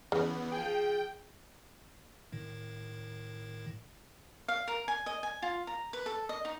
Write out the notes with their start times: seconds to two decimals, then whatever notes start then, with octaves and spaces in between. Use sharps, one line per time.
0.12 E2 C#3 B3
0.52 F3 G#4 G5
2.32 A2 D#3
4.48 F5
4.68 A#4
4.88 G#5
5.06 D#5
5.23 G#5
5.42 F4
5.67 A#5
5.93 B4
6.06 A4
6.29 D#5
6.45 D#4